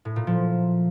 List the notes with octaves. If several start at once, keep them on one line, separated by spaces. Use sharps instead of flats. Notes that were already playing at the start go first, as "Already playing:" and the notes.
A2
A#2
F3